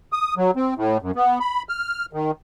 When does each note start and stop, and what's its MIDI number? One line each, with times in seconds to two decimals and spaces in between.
0.12 0.34 87
0.37 0.51 54
0.56 0.74 60
0.77 0.98 45
1.02 1.11 42
1.16 1.39 59
1.40 1.62 83
1.69 2.06 89
2.13 2.31 51